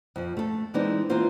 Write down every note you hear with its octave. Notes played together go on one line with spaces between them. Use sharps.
F2 F3
A3 A4
E3 G#3 C4 D4 D#4
E3 A#3 C4 F4 C5